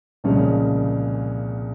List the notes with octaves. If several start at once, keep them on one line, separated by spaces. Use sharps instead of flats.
C2 A#2 C#3 F3 G#3 C#4